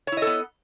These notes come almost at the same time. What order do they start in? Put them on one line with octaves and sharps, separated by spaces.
C#5 E4 D#5 A4 B3